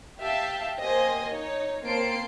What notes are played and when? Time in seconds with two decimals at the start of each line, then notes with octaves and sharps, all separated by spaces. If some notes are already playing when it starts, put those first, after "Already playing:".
0.19 G4 E5 F5 G5 A5
0.80 A#3 G4 C5 D#5 G#5
1.30 D#4 C#5
1.84 A#3 C4 A5 C6 C7 D7